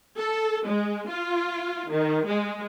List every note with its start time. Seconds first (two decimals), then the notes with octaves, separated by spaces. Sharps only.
0.18 A4
0.67 G#3
1.09 F4
1.91 D#3
2.26 G#3